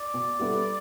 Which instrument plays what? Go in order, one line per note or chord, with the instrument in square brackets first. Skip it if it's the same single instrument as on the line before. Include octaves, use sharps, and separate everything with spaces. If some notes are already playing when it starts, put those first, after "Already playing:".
Already playing: [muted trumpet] D5
[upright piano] B2
G3 B3 E4 A4